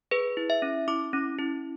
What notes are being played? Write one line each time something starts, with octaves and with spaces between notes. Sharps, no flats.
G#4 B4
E4
E5
C#4
E4 D6
C#4
E4